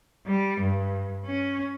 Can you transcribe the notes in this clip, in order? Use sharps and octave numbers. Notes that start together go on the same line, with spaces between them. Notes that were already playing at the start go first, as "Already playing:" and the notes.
G3
G2
C#4